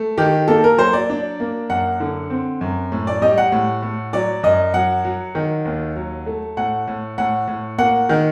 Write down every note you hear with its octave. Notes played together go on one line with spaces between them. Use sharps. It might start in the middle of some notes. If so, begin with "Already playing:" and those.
Already playing: A3
D#3 G4
A#3 A4
A#4
F#3 C5
D5
D4
A#3
F#2 F#5
D3
C4
F#2
A2
D5
G3 D#5
F#5
A2
A2
F#3 D5
F#2 D#5
F#3 F#5
F#3
D#3
D#2
F#3
A3
A2 F#5
A2
A2 F#5
A2
A#3 F#5
D#3